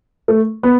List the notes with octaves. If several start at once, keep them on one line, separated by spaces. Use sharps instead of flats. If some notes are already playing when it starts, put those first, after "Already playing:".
A3
B3